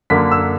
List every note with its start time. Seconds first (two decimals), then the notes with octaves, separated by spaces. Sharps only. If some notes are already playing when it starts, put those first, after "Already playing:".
0.10 F#2 D3 A#3 B6
0.31 E6